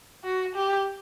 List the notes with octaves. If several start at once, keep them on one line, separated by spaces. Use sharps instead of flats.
F#4
G4